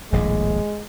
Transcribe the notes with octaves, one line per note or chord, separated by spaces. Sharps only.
D#1 A#1 A2 G#3